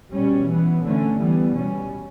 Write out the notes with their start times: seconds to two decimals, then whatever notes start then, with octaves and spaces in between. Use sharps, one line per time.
0.13 B2 G3 C#4
0.49 E3 B3
0.83 D3 A3 C#4
1.18 E3 G3 B3
1.54 B2 G3 C#4